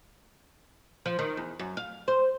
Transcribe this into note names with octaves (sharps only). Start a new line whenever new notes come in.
F3
D#3
E2
F#2
F5
C5